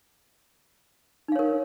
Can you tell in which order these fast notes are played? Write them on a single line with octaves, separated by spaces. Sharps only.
D#4 F5 C#5 A#4